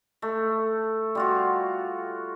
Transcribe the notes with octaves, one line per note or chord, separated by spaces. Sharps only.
A3
G3 F4 F#4